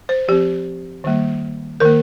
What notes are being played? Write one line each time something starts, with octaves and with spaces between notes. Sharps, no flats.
C5
F3 C4 G4
D#3 G3 A#3
D#3 A#3 A#4